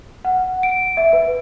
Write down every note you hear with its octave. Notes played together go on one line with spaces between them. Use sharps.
F#5
D7
E5
B4